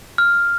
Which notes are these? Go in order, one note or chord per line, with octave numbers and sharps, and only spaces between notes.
F6